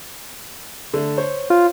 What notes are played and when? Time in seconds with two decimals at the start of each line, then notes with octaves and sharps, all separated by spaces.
0.94 D3 A3
1.17 C5 C#5
1.50 F4